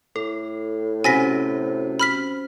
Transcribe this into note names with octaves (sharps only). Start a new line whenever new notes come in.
A2 A4
C3 C#4 F#4 C5 G#5 A#6 B6
B5 F6 B6